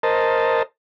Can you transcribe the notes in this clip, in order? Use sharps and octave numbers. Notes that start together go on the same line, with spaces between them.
A#4 C5 D#5 A5